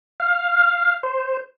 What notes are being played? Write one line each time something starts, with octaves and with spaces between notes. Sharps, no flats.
F5
C5